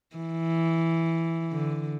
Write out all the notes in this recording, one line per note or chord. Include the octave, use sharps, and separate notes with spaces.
E3
D3